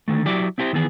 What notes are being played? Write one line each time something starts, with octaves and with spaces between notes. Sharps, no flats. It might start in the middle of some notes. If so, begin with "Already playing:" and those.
D3 D#3 A3
F#3 E4 G4 D5
C4 E4 G4 C5
D#3 E3 B3 G#4